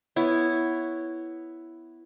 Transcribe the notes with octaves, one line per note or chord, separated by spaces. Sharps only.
B3 E4 C#5